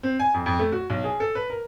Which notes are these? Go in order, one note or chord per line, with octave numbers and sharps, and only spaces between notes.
C4
G#5
F2
F2
A3
F#4
B1
G#4
A4
B4
A#4